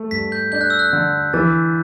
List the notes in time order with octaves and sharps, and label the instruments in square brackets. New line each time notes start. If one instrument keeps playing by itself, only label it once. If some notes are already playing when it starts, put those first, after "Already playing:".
Already playing: [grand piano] A3
[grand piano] G2 [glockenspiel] B6
[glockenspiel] G6
[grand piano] D4 [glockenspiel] G6
[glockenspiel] F#6
E6
F#6
[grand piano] D3
[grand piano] E3 [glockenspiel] A6